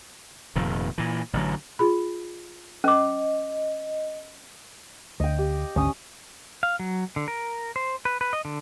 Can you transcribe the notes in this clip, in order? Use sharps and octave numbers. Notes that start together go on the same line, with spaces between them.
F1 F2 A#2 D#3
A#2 E3
A1 D3 D#3 F#3
F4 G#4 B5
C#4 D#5 D6
D2 D#5 G5
G4
G#1 D2 C#4 D#6
F5
F#3
D3
A#4
C5
B4
B4
D#5
D3